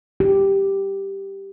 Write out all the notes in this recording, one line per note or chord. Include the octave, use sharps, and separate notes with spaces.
G4